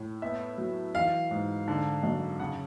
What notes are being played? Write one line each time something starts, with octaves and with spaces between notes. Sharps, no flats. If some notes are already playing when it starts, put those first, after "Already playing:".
Already playing: A2
B3 E5
F#3
E3 F5
G#2
D3
F#2
C#3 F#5